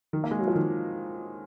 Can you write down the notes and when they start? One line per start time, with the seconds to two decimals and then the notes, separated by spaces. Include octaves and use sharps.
0.13 D#3
0.24 A#3
0.31 G#3
0.39 F#3
0.48 F3
0.55 D#3